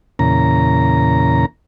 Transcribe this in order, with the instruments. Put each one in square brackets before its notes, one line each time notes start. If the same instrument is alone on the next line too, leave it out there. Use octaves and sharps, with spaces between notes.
[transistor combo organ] E2 A#2 C#3 A#5